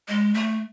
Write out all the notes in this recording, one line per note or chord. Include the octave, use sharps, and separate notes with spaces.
G#3
A3